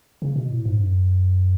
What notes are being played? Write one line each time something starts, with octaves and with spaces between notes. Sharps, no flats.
C#3
B2
A2
G#2
F#2